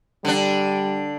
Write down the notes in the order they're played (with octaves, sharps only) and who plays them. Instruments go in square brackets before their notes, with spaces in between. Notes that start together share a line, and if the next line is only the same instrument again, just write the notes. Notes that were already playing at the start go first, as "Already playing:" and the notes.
[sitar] D3 D4 [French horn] G3